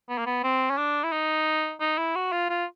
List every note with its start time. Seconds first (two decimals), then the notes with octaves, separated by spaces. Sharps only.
0.09 B3
0.18 A#3
0.27 B3
0.44 C4
0.71 C#4
0.78 D4
1.04 E4
1.12 D#4
1.81 D#4
1.98 E4
2.16 F#4
2.32 F4
2.50 F4